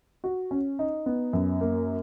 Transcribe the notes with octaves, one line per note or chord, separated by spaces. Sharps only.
F#4
C#4
D#4
B3
F#2
A#3